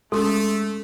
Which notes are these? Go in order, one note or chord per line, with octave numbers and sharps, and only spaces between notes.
G#3 A3 C#4 A4 C6